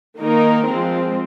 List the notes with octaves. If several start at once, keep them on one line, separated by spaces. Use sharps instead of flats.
D#3 A#3 D#4 A#4
F3 G#3 C4